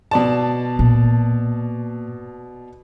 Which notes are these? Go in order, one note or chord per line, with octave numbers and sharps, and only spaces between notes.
B2 D5 A5
A#2